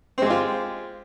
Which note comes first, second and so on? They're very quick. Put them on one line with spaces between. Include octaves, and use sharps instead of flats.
C4 G#3 G4 F4